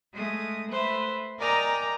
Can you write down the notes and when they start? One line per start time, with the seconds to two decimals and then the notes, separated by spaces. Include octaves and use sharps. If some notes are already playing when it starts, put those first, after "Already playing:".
0.13 G#3 A3 D#6
0.69 A3 B4 C5 E5
1.40 A#4 D5 D#5 G5 G#5 A#5